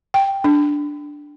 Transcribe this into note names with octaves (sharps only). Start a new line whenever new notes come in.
G5
D4